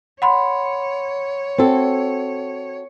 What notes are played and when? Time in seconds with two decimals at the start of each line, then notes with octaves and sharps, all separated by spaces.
0.22 C#5 F#5 B5 C6
1.58 C4 F#4 A4